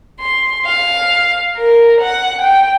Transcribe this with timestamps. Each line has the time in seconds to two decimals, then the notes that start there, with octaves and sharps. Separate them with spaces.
0.20 C6
0.65 F5
1.57 A#4
2.00 F#5
2.42 G5